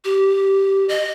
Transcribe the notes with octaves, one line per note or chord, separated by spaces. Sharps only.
G4
D#5